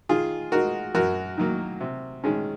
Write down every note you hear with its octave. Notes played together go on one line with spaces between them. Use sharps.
D#3 F4 G#4
G#3 D#4 F#4 A#4
F#2 F#4 A#4
D#3 F#3 A#3
C3
D#3 G#3 C#4